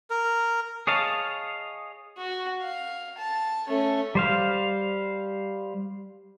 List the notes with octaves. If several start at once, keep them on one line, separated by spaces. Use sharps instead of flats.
A#4
G#4 C#5 D#5 F5 A5
F#4
F5
A5
A3 C#4
G3 C5 F5